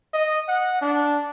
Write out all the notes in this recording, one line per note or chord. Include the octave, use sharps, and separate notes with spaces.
D#5
F#5
D4